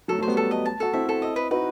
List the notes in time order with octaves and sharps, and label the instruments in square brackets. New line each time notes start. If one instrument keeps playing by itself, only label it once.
[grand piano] F#3 A3 [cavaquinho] A4
[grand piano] F#3 A3
[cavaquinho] C5
[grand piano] G3 B3
[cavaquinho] A4
D#5
A5
[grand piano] F#4 [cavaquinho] A4
[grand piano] C4 E4 [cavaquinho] E5
[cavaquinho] A4
D#5
B4
[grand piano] D#4 F#4 [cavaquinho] B4